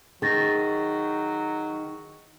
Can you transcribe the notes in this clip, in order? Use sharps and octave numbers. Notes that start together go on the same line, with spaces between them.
D#3 F#3 G#4 A6 A#6